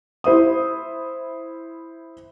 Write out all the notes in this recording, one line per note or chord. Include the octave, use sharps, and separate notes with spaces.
E4 C5 E5 D#6